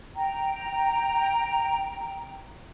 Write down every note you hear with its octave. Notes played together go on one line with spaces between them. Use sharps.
G5 A#5